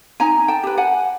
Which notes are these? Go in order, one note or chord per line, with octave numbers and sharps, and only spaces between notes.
D#4 G#5 A#5
G5 A5
G4 B4
F#5 G#5